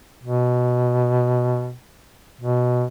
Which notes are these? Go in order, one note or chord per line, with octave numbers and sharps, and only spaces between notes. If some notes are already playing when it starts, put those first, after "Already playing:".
B2
B2